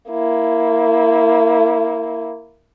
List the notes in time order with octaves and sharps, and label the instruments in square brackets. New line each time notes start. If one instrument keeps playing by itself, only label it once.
[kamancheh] A#3 E4